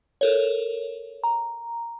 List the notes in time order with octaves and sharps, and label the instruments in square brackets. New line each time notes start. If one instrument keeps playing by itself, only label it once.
[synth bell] A4 A#4 C#5
A#5